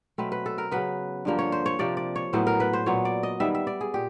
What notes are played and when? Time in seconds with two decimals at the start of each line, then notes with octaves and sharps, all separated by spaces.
0.18 B2 F#3 A3 C4 B4
0.32 B4
0.46 A4
0.58 A#4
0.71 C#3 F#3 B3 B4
1.25 G2 D3 F3 A#3
1.39 C#5
1.52 C5
1.66 C#5
1.79 C3 F3 A#3 D5
1.97 D5
2.16 C#5
2.33 A2 F#3 B3 C5
2.47 A#4
2.60 B4
2.73 C5
2.86 A#2 F#3 B3 C#5
3.05 D5
3.23 D#5
3.40 D#3 G3 B3 E5
3.55 E5
3.67 D5
3.81 G#4
3.94 A#2 G4